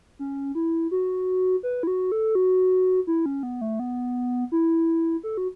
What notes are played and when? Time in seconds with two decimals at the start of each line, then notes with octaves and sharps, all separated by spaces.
0.19 C#4
0.55 E4
0.91 F#4
1.63 B4
1.83 E4
1.87 F#4
2.12 A4
2.35 F#4
3.07 E4
3.26 C#4
3.43 B3
3.61 A3
3.80 B3
4.52 E4
5.23 A4
5.37 F#4